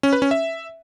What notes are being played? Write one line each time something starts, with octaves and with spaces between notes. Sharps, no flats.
C#4
B4
C#4
E5